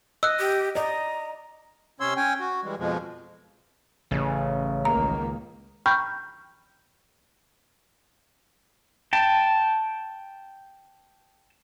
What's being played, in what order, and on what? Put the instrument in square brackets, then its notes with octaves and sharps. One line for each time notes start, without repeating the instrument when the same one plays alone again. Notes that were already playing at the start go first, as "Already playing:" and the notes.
[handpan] D#5 [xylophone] E6 F#6
[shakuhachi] G4
[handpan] D5 D#5 [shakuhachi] A#5
[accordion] C3 C#4 C#5 C6 E6
C#4 C#5 G5 G#5
F#4
E3 G3 G#3
F2 B2 F3 G#3
[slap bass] A1 [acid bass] C#3
[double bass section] C#2 D#3 A#3 [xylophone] A#5
[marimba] G5 A#5 B5 C#6 F6 G6
[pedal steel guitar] G5 A5